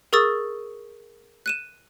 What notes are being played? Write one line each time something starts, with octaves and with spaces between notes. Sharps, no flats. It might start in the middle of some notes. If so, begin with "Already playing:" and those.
G#4 A#4 C#6 D#6 E6 A6
F#6 D#7 E7